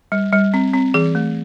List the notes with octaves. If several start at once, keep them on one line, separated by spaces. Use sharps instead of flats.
G3
G3
C4
C4
E3 G#4
A3